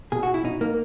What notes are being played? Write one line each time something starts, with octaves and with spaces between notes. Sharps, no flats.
B2 G#4
F#4
E4
B2 D#4
A#3